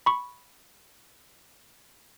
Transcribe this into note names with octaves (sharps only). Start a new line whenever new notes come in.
B5 C#6